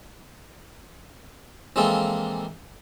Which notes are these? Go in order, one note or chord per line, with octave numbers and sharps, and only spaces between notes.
E3 F3 G#3 A#3 C4 A4